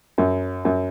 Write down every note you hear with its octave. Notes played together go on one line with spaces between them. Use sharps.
F#2
F#2